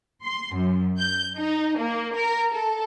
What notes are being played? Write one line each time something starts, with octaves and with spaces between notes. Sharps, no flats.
C6
F#2
G6
D#4
A#3
A#4
A4